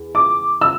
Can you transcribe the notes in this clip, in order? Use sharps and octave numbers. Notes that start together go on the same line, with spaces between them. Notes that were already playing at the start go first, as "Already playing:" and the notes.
Already playing: E2
D6
E6